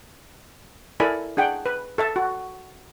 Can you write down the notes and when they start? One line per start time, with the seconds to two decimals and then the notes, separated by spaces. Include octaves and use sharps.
1.00 E4 A4 A#4 D5 G#5 B5
1.37 D4 G#4 F#5 G5
1.66 B4
1.98 A4 E5 A5
2.16 F#4